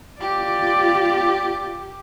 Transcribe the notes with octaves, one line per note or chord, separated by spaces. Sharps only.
F4 G4 D5